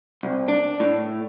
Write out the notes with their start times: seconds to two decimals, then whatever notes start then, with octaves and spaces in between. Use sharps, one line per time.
0.23 C2
0.48 D4
0.80 A2